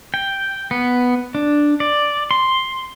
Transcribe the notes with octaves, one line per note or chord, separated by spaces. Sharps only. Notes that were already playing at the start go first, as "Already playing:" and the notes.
G5
B3
D4
D5
C6